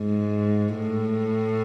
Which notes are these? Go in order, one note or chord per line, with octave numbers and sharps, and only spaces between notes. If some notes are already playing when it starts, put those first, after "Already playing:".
Already playing: G#2
A2